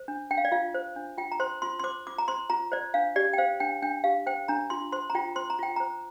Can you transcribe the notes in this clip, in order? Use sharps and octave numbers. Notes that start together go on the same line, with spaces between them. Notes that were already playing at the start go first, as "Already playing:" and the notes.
Already playing: C5
D4
D4 G5
F5
D5
F4 F5
C5
D4
F4 G5
A#5
C5 C6
F4 C6
C6
C5 D6
F4 D6
A#5
C5 C6
F4 A#5
C5 D5
D4 F5
G4 D5
G5
C5 F5
D4 G5
D4 G5
G4 F5
C5 G5
D4 A#5
F4 C6
C5 C6
A#5
F4 G5
C5 C6
A#5
F4 G5
C5 A#5